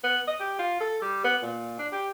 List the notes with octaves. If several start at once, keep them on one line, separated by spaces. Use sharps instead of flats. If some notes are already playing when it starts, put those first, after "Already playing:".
B3
D#5
G4
F4
A4
G3
B3
A#2
D4
G4